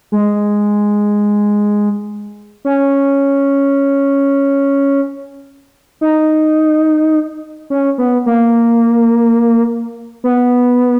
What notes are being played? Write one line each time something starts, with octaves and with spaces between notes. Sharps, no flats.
G#3
C#4
D#4
C#4
B3
A#3
B3